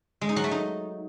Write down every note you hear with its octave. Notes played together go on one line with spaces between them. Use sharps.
G#3
D#4
F#3
A3
D#4